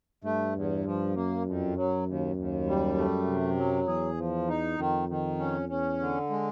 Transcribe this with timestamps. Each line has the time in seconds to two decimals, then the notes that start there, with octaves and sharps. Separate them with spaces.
0.24 G2 A3
0.55 E2
0.85 F3
1.15 F#2 A#3
1.46 F2
1.76 F#3
2.06 D#2
2.36 D#2
2.67 G3
2.97 A3
3.27 C3
3.57 F#3
3.87 E2 G#4
4.17 F3
4.48 D#4
4.78 F2 D#3
5.09 D#3
5.39 C#4
5.69 E2 C#4
5.99 D3
6.30 G#3